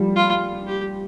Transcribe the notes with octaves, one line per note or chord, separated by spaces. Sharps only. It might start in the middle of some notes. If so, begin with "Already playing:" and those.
Already playing: F3 G3
F4
G4